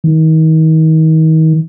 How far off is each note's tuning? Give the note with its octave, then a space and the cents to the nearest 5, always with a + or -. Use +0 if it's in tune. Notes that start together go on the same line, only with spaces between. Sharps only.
D#3 +35